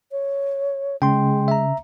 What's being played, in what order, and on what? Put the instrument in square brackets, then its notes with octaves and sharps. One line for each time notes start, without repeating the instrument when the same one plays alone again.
[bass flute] C#5
[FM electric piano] C#3 [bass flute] G#3 [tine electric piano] G5 C6
[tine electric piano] E5 A#5